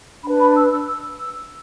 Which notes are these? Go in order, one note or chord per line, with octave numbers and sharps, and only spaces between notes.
D4 B4 B5
B5
E6
E6
E6
E6